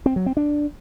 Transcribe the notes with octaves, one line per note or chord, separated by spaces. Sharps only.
C4
F#3
C4
D4